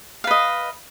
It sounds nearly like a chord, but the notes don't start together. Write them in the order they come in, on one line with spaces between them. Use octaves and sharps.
F5 B4 D#5